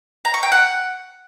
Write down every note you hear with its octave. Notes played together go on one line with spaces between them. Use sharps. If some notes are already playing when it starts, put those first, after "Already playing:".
A#5
C#6
G5
F#5